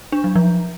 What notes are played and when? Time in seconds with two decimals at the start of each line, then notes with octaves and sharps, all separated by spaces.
0.12 D4
0.24 F#3
0.36 F3